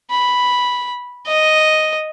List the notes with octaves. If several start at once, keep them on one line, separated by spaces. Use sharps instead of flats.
B5
D#5